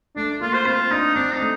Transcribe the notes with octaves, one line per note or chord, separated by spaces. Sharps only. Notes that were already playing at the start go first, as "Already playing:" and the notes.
A3 D4
A#3 F4
C5
C4 F4
D4 D#4
C4 D4
D#4
A3